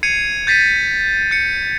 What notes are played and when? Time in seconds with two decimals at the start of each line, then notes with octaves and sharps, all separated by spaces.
0.03 G#6 C7 C#7 D#7 F7
0.47 G6 A6 B6 C7 D#7
1.31 G6 C#7